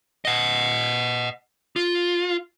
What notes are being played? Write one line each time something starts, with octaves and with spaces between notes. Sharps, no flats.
D#5 F#5
F4